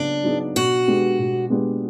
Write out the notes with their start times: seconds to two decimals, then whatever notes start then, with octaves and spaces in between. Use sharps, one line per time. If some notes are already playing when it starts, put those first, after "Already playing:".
Already playing: C#3 F#3 B3 D4
0.24 F#3 B3 D#4 G#4
0.56 B2 F#4
0.87 G#3 B3 D4 G4
1.18 B2
1.50 G#3 B3 D4 G4